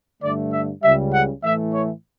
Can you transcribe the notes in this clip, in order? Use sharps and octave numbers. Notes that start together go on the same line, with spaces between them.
G2 D3 A3 D5
E5
C#2 C#3 G3 E5
F#5
A2 E3 A3 E5
C#5